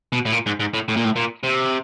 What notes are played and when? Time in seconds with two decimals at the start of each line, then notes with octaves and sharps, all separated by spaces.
0.12 B2
0.25 A2
0.32 A#2
0.46 G#2
0.60 G#2
0.74 A2
0.88 A2
0.96 A#2
1.05 A2
1.16 A#2
1.44 C3